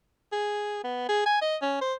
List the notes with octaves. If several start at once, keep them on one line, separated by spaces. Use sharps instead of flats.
G#4
B3
G#4
G#5
D#5
C#4
C5